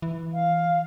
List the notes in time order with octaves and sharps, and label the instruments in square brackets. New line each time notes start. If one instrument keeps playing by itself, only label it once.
[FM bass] E3
[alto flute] F5